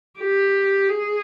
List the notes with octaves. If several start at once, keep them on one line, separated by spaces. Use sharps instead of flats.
G4
G#4